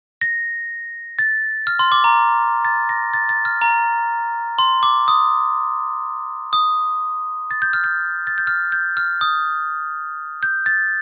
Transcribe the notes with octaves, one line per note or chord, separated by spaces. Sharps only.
A#6
A6
F6
C6
D6
A#5
A6
A#6
A6
A6
F6
A#5
C6
D6
D#6
D#6
A6
G6
F6
G6
A6
G6
F6
G6
F6
D#6
G6
A6